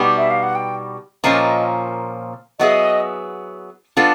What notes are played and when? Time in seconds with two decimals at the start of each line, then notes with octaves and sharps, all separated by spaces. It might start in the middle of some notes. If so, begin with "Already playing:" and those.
Already playing: B2 G3 B3 D#4 G4
0.17 E5
0.30 F5
0.43 F#5
0.55 G5
1.24 A#2 F3 A#3 C#4 D#5
2.59 F#3 B3 E4 G#4 D#5
3.97 G3 B3 D4 F4 A4